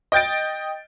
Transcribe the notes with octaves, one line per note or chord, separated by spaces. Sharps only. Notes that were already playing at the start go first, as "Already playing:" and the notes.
D#5 G5 G6 A6 D7